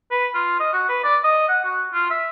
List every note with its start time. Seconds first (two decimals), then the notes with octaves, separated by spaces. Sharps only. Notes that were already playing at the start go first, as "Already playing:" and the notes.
0.11 B4
0.35 F4
0.60 D#5
0.73 F#4
0.89 B4
1.04 D5
1.24 D#5
1.49 F#5
1.65 F#4
1.94 F4
2.11 E5